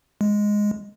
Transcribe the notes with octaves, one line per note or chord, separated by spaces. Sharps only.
G#3